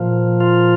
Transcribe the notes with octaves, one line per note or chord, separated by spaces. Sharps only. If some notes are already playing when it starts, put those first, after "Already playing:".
Already playing: A#2 F3
F4